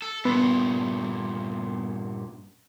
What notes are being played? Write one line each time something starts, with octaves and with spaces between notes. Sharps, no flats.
A4
G2 A#2 B3